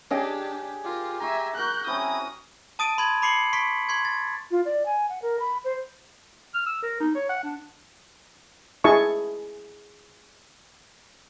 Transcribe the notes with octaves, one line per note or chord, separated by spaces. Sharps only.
C#4 D4 G4 G#4 D#5 G5
F4 G4 A#4
E5 G#5 A#5 C6 C#6
F#4 A#4 F#5 F#6 G6
C4 C#4 E4 F#4 D#6
A5 D#6 A6 D7 D#7
B5 C6 D#6 G#6
B5 D6 C7 C#7 F#7
C6 C#6 B6 D7
C6 C#6 G#6
A6
F4
D5
G#5
F#5
A#4
B5
C5
F6
E6
A#4
D#4
C#5
F#5
D4
E4 G#4 D#5 A5 C#6